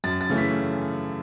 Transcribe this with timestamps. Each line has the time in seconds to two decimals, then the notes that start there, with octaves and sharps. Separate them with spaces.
0.04 F#2 A6
0.21 A6
0.29 C#3 E3 A3 C#4
0.38 B6